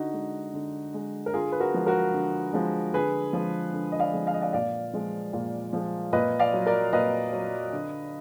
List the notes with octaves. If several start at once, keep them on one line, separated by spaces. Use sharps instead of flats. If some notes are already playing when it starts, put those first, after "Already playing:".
Already playing: D3 D#4 F#4
G#3
D3
G#3
A#4
D3 F4 G#4
B4
F#4 A#4
F3 G#3
F#4 A#4
D3
F3 G#3
D3 G#4 B4
F3 G#3
D3
D#5
D5 F5
F3 G#3
F5
D#5
D5 F5
A#2 D5 F5
F3 G#3
A#2
F3 G#3
A#2 B4 D#5
D5 F5
F#3
A#4 D5
A#2 B4 D#5
F#3
D3